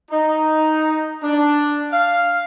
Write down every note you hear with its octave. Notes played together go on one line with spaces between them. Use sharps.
D#4
D4
F5